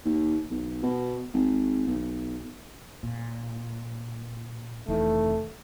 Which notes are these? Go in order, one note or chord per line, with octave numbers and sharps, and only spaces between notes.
D#2
B1
B2
G#1
B1
A#2
F1 D#3 E3 A3